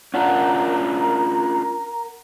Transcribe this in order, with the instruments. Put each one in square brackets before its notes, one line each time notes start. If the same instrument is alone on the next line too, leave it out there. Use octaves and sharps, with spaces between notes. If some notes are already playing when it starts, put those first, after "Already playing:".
[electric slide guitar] C#4 D4 F4 [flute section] A#4 A#5 [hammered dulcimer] F#5